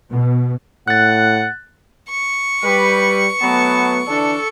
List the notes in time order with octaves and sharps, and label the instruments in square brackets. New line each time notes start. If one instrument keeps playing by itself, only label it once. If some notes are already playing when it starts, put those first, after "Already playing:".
[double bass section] B2
[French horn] A2 [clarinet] F#5 [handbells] F#6 A6
[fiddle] C#6
[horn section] G3 [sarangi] B4
[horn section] F#3 A3 B3 [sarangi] A5
[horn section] D3 E3 D4 [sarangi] A4